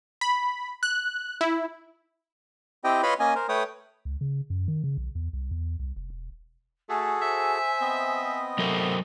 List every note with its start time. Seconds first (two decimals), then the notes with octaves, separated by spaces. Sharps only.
0.21 B5
0.83 F#6
1.41 E4
2.84 C4 E4 G4 D#5 G5
3.03 F4 B4 C#5 D#5 B5 C6
3.20 A#3 C#4 D#5 G#5
3.35 A#4 C5
3.49 A3 B4 C#5 G5 D#6
4.05 C#2
4.21 C#3
4.50 F#2
4.68 D#3
4.84 C#3
4.97 B1
5.15 E2
5.33 C2
5.51 E2
5.79 C2
5.96 F1
6.10 E1
6.89 A3 F#4 G#4 A4 G#5
7.22 C5 E5
7.81 B3 C4 D#5
8.59 F#3 A3 A#4 C5